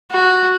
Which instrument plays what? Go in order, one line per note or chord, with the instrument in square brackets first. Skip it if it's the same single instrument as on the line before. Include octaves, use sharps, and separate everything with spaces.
[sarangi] F#4